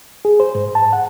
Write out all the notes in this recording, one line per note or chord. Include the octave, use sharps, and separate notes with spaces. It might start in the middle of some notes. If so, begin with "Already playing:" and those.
G#4
C5
G#2
A5
F#5